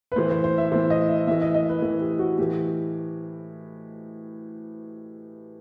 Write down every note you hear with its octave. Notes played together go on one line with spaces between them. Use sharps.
B4
A2 E3 C5
C5
C5
E5
A2 E3 C5
D#5
E5
A2 E3 E5
D#5
D#5
B4
A2 E3 B4
G4
F#4
A2 E3 G4